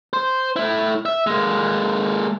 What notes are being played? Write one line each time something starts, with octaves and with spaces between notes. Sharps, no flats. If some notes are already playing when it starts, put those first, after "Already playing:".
C5
A3 E4
E5
G#3 A#3